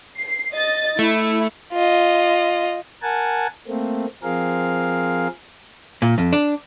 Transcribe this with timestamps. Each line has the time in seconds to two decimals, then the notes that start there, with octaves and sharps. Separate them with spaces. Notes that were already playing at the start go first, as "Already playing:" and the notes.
0.18 C7
0.52 D#5 A6
0.99 A3 E4
1.73 F4 D#5
3.02 A#4 F#5 G#5 A5
3.68 A3 A#3 C4
4.23 F3 C4 G#4 A#4 F5
6.02 A#2
6.18 F2
6.33 D4